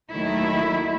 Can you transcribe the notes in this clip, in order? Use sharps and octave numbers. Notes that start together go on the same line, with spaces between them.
D#2 D#3 F#3 A3 E4